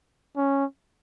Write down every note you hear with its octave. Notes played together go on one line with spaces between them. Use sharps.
C#4